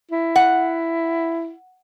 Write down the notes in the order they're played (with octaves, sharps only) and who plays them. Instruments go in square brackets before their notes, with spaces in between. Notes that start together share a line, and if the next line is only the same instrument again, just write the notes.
[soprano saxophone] E4
[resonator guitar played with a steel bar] F#5